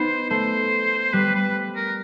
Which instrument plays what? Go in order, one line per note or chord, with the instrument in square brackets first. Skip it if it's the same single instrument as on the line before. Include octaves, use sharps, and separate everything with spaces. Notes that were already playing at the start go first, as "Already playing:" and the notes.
Already playing: [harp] B3 D#4 [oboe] C5
[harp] A3 [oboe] C5
[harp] G3 [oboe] B4
[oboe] B4
A#4